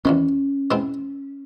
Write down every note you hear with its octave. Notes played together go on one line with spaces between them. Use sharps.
E2 C3 D#3 C#4
B2 G#3 C4 E4